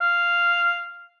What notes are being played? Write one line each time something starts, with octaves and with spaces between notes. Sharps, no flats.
F5